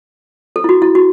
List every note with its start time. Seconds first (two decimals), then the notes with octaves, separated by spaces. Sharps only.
0.56 A4
0.64 E4
0.69 F#4
0.82 E4
0.95 F#4